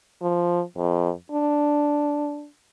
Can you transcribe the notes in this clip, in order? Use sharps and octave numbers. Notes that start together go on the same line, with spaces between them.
F3
F2
D4